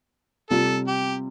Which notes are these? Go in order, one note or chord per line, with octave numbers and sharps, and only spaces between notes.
C3 G3 F4 A4
G4